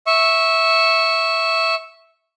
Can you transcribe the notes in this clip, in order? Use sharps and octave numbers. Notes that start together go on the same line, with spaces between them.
E5 C#6